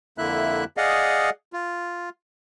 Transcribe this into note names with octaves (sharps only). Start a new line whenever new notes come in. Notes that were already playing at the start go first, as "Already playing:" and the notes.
F2 D3 A#3 E4 E5 F#6
G#4 D5 D#5 F5 F#5
F4